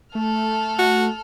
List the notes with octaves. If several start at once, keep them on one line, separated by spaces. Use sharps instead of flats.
A3 A4 F6
F#4